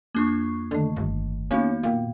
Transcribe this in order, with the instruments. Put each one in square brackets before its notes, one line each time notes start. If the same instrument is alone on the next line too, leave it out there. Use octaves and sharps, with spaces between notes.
[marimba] F2 [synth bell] A#3 D4 C#6
[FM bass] D3 [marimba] D#3 A3
[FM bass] G1
[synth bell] A#3 D#4 [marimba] B3 F#4 F5 [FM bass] C#4
[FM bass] A#2 [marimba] F5 G5